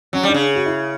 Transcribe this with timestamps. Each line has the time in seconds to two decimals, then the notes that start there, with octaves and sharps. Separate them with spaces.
0.13 F#3 C#4
0.23 G3
0.29 D4
0.34 C#3
0.55 F#4
0.66 E4